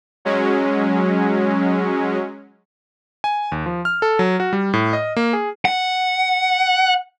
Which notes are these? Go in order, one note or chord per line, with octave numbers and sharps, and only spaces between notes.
F#3 G#3 C#4
G#5
D#2
F3
F6
A4
F#3
F#4
G3
A2
D#5
A#3
G#4
F#5